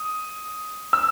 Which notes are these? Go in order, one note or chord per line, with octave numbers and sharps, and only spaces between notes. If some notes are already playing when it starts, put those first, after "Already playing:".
Already playing: D#6
E6